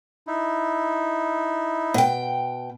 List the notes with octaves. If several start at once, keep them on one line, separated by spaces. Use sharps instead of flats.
D#4 E4
B2 G5